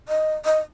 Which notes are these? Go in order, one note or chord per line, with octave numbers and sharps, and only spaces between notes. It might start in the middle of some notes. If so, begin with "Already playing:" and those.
D#5
D#5